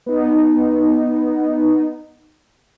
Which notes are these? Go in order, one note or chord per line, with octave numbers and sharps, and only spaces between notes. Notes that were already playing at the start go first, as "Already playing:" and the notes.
B3 D#4